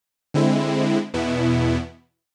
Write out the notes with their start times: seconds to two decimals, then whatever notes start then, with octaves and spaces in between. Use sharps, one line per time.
0.34 D3 G#3 C4 E4
1.13 E2 B2 B3 E4